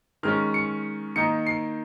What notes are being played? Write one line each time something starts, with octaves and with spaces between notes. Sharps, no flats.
D#3 G#3 C#4 F6
C#7
D#3 A#3 D#4 C#7
C7